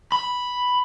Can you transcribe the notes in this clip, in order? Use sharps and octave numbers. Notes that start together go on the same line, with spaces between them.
B5